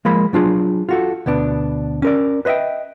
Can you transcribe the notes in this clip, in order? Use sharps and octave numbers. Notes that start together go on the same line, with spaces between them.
F3 G#3 A#3 B5
F#3 D4 F4 G#4
F4 F#4 A4
D2 B2 B3 D4
C#4 A#4 D5
B4 C5 D#5 E5 G5